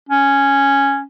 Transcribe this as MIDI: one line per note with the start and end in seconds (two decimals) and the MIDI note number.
0.09 1.02 61